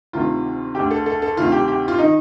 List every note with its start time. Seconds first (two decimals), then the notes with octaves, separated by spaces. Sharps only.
0.13 D2 C3 D#3 F4
0.75 D2 D3 G4
0.91 A4
1.06 A4
1.22 A4
1.36 D2 C3 D#3 F4
1.52 G4
1.68 G4
1.88 F4
1.99 D#3 D#4